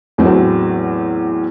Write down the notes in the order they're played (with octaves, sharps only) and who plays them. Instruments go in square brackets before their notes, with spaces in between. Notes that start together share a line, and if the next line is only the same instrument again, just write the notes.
[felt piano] E2 A2 F#3 C4